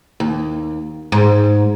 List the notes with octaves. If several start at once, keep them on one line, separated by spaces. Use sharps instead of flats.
D#2
G#2